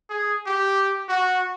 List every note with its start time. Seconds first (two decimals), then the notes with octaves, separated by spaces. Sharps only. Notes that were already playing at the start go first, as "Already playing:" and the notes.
0.10 G#4
0.46 G4
1.08 F#4